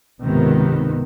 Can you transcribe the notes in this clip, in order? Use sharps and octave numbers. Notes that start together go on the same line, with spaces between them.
C#2 G#2 C3 D#3 B3